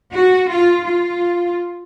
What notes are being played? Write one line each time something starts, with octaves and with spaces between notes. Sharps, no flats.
F#4
F4
F4